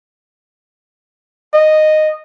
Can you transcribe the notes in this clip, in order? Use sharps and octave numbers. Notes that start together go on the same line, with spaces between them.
D#5